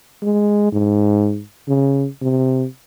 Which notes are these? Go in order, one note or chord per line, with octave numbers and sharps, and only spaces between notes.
G#3
G#2
C#3
C3